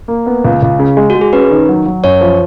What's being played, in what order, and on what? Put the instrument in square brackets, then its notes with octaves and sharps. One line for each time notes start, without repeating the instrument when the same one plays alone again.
[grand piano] A#3
B3
C#2
C#2
C#3
G#3
[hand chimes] F#4
[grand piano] G#3
[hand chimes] G#4
[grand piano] C#4 [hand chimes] B4
[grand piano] D#3
F#3
F#3
[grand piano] F#2 [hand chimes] C#5
[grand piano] F3